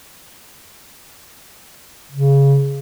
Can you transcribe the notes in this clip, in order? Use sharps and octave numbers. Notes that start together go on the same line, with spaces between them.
C#3